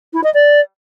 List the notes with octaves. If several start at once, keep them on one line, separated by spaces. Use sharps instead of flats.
E4
D#5
D5